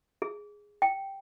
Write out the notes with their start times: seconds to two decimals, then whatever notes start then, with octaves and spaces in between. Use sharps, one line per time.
0.22 G#4
0.82 G5